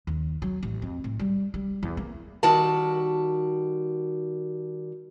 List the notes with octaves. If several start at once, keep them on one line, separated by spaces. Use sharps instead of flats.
D#2
F#3
A1
F2
A2
G3
G3
E2
A#3
D#3 G3 F#4 A5